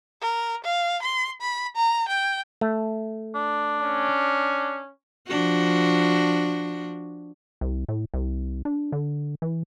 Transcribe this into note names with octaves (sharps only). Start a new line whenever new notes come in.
A#4
F5
C6
B5
A#5
G5
A3
D4
C#4
F3 D4 F#4
C2
A2
C2
D4
D3
E3